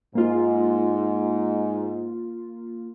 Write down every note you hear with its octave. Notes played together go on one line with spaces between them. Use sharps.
G#2 A#3 F4